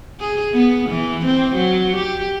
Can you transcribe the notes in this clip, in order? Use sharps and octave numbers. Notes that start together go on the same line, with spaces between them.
G#4
B3
E3
C4
F#3
G4